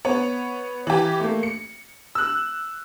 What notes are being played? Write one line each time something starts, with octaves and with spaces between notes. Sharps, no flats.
B3 C#5
E3 G4
A3 A#3
C#7
E6 F#6